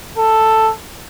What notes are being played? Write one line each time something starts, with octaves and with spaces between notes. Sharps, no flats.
A4